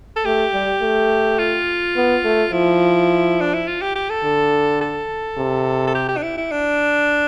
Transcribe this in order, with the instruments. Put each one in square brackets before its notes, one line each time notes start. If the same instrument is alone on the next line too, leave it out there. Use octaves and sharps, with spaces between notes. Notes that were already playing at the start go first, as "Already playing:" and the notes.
[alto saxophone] A4
[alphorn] A3 [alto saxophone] G4
[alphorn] G3
A3
[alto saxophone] F4
[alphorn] B3
A3
[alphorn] F3 [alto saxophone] E4
[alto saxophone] D4
E4
F4
G4
G4
A4
[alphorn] D3
[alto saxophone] A4
[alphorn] C3
[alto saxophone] A4
G4
G4
D4
E4
E4
D4